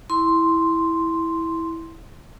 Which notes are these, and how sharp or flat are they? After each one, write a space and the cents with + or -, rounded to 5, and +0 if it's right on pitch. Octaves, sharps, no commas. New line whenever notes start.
E4 -10 C6 +0